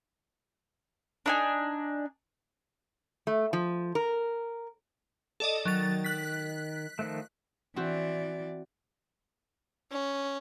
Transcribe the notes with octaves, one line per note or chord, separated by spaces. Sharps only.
D4 D#4 G#5
A3
F3
A#4
A4 D5 D#5
D#3 F#3 A6
F#6 B6
D#3 F3 A3
E3 C4 F#4 D5
C#4